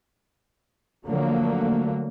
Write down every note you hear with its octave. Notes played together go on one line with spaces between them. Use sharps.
D3 F3 F#3 A3 A#3